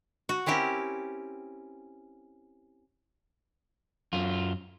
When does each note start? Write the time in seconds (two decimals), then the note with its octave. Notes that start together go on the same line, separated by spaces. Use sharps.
0.29 F#4
0.46 C4 C#4 E4 G4 A#4
4.13 F#2 F4